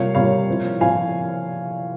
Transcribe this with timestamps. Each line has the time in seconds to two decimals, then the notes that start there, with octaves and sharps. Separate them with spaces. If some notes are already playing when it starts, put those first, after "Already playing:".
Already playing: C3 G3 A#3 F4 C#5 F5
0.15 C3 G3 A#3 F4 C#5 F5
0.48 A#2 F3 C4 E4
0.80 A#2 F3 C4 E4 F5 G#5